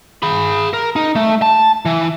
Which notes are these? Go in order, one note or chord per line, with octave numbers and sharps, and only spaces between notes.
G#4 B5
A#4
D#4
A3
A5
E3